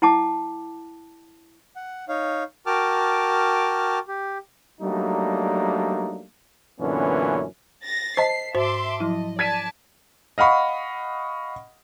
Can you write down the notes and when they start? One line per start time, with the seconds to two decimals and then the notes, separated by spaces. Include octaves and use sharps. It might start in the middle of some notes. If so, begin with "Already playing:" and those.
0.02 E4 F#5 A5 D6
1.76 F#5
2.09 D#4 C#5 F5
2.66 F#4 A#4 G5 A5 D6 F6
4.08 G4
4.81 F#3 G3 A3 A#3 D4 D#4
6.79 F#2 A#2 D3 E3 B3 C#4
7.84 A6 A#6
8.17 C5 D#5 A5 B6 C7
8.55 G#2 F#4 C5 E5 C6 D6
9.00 F3 F#3 E4 D#5
9.39 D5 A5 G#6 B6 D#7
10.38 D#5 F5 F#5 B5 C#6